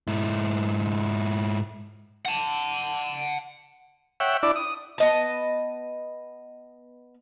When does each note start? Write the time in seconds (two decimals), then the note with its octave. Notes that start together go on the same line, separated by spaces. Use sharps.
0.07 G#2 E4
2.25 F#5 A5
4.20 C#5 E5 F#5 G5
4.43 D4 E4 D5
4.56 D#6
4.98 B3 D#5 A5